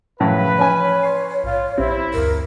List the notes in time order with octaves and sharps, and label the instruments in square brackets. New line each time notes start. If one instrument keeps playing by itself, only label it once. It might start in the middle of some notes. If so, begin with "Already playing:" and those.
[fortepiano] F#2 A2 C#3 [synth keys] E3 F3 [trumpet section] B4
[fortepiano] C#4 G#5 [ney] C#5
[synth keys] C6 C#6 C7
[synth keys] A#1 G#2 [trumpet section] F4
[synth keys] A#1 G4 [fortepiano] C4 [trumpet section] E4
[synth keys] D2 G2 [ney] A#4